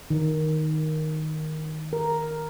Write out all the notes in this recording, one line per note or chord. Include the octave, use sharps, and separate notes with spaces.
D#3
A#4